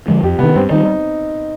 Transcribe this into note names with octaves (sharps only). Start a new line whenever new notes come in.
D3 F3 G#3
F2 G4
C3 D#3 B3
G2 C4
D#3 G3 D#4